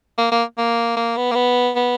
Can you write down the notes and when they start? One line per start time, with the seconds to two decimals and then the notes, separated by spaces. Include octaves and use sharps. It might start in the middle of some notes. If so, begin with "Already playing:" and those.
0.18 A#3
0.32 A#3
0.58 A#3
0.96 A#3
1.17 B3
1.31 A#3
1.35 B3
1.75 B3